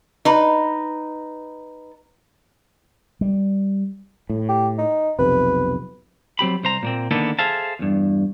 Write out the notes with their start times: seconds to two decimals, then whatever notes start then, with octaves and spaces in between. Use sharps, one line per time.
0.25 D#4 B4
3.21 G3
4.30 A2
4.49 G4
4.78 D#4
5.19 B1 F2 C3 B4
6.39 F#3 C4 G4 B5
6.64 C2 C5 A#5
6.83 A#2 A#3 C4
7.11 D3 D#3 A#3 B3 E4 A4
7.39 G#4 A4 C5 E5 F5 A5
7.79 E2 G2